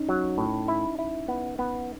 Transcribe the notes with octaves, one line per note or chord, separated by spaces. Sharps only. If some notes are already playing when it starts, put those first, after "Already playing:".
Already playing: C#4 D#4
F#3
A2
E4
E4
B3
B3